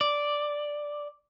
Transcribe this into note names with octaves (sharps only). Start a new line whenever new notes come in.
D5